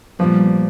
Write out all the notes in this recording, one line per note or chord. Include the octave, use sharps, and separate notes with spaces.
A#2 F3 G3 B3